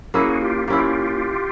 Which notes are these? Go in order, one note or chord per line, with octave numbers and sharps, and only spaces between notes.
A#3 C#4 E4 F#4 G#4
F4 G4
A#3 C#4 E4 F4 G4